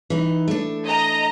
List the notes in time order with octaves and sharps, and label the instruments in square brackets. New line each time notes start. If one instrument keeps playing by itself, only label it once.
[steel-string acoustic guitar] E3 D#4
A3 D4
[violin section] D#5 A#5